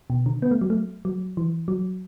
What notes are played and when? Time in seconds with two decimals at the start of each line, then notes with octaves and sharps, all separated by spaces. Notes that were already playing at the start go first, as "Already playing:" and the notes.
0.10 B2
0.26 D3
0.42 B3
0.51 A3
0.61 F#3
0.70 A3
1.05 F#3
1.37 E3
1.68 F#3